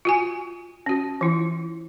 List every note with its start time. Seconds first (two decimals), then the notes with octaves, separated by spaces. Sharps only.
0.05 F4 F#4 G#5
0.86 C#4 F#4
1.21 E3 E4 F4